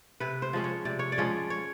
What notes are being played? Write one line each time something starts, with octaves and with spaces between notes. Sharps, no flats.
C3 B4
C5
F3 G#3 C#4
C#5
C3 D5
C#5
D5
F3 G#3 C#4
C#5